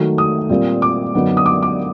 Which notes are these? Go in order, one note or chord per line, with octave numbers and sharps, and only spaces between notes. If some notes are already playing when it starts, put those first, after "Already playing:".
Already playing: D#3 F#3 A3
D#6
A#2 G3 C4
D6
F#2 D3 F#3 B3 D#4
D#6
D6
D6